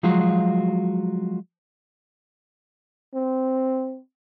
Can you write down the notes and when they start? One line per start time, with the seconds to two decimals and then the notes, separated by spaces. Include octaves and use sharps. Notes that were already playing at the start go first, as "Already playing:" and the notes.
0.03 F3 F#3 G#3 F4 F#4
3.14 C4